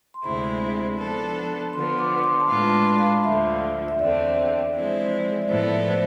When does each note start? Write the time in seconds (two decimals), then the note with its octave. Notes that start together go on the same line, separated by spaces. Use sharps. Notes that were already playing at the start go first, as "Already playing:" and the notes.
0.14 C6
0.24 D2 C3 G#3 C4 E4 B5
0.98 F3 B3 D4 A4
1.73 D3 F3 B3 C6
1.99 D6
2.19 D6
2.24 C6
2.40 A5
2.48 A2 G#3 D4 F4 B4 B5
2.69 A5
2.74 B5
2.99 F5
3.23 D2 D3 F3 E5
3.88 E5
3.99 E2 D3 A3 C4 D5
4.74 F3 G#3 C4 E4
5.42 D5
5.49 A2 F3 B3 E4 A4 C5
5.74 C5
5.90 C5